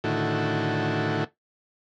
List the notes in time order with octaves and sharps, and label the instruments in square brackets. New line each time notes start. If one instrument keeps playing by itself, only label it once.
[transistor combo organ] A2 D3 D#3 E4 F#4 A4